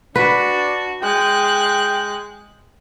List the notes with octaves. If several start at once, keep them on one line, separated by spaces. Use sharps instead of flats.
D4 F#4 B4
G#3 G5 F#6